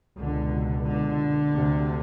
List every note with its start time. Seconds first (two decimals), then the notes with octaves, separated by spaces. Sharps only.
0.18 C#2 B2 D3
0.85 D3
1.52 D2 C3